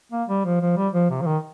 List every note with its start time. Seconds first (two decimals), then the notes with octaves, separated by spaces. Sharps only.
0.12 A#3
0.29 G3
0.45 F3
0.61 F3
0.77 G3
0.94 F3
1.10 C3
1.21 F3
1.26 D#3